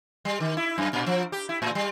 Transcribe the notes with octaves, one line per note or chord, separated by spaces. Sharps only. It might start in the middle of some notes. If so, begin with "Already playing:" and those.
G3
D#3
E4
F#2
A#2
F3
G4
E4
A2
G3